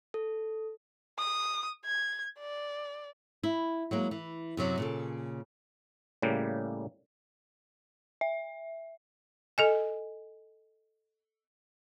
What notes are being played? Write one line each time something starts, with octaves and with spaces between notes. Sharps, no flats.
A4
D#6
G#6
D5
E4
F#3 G#3 A#3
E3
F#2 C3 F#3
A#2 C#3 A4
A2 C#3 G3 A#3
E5
A4 D#5 G#5